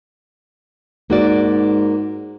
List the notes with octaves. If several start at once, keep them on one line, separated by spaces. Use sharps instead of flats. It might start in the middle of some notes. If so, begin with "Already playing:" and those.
G#2 A#3 F#4 D5